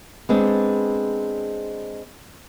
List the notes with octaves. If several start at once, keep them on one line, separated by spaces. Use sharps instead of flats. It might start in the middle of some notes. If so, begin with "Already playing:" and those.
G#3 B3 C4 D4